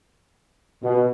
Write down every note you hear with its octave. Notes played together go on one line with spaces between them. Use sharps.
B2